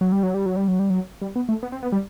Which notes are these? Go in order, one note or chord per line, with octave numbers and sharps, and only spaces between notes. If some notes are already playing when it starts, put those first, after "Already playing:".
F#3
G3
F#3
G3
F#3
G3
F#3
G3
F#3
G3
B3
A3
B3
C4
B3
G3